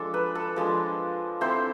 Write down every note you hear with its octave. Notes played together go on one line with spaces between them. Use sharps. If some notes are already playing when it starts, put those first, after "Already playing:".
Already playing: F3 G#3 D4 A4
B4
A4
F3 G#3 D4
A3 C4 E4 C5